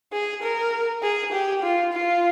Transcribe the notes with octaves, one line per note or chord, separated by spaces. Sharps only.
G#4
A#4
G#4
G4
F4
F4